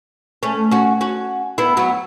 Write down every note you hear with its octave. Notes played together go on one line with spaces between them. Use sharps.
A3 C#4
C#4 F#4
C#4 F#4
B3 E4
F#3 B3